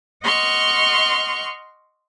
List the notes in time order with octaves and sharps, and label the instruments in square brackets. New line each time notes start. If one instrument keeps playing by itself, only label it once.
[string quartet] D#5 F#5 C6 C#6 F6